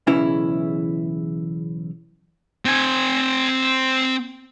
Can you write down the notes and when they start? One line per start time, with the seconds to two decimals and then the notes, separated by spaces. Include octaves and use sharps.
0.07 B1 E2 C#3 E3 C#4 E4
2.65 C4 G#5